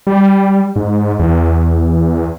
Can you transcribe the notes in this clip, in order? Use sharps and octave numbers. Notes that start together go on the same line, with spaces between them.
G3
G#2
E2